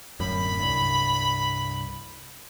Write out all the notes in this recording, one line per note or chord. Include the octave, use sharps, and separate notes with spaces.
D1 F#2 B5
C2 G2